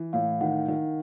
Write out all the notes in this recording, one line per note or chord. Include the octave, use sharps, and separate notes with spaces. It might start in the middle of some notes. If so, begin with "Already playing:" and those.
Already playing: E3
A2 F5
D#3 F#5
D#3